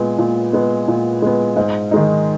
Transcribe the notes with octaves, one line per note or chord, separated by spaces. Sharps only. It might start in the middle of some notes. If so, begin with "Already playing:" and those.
Already playing: A#2 G#3 B3
A#2
G#3 B3
A#2
G#3 B3
G#2
D#3 G#3 D#4